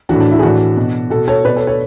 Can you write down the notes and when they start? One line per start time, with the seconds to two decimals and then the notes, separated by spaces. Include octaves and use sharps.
0.09 A2 E3 D4 F#4
0.20 D4
0.32 E4
0.39 G#4
0.43 A2 E3 D4 F#4
0.77 B2
1.10 B2 F#4 A4
1.28 A4 C#5
1.45 B2 B4 D5
1.56 A4 C#5
1.67 A4 C#5